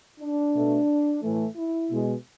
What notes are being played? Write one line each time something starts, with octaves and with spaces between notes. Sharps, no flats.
D4
B2 A3
A2 E3 A3
E4
B2 G#3